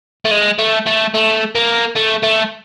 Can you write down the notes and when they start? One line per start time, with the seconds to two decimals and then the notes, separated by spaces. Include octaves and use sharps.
0.25 A3
0.31 G#3
0.59 A3
0.86 A3
1.14 A3
1.55 A#3
1.96 A3
2.23 A3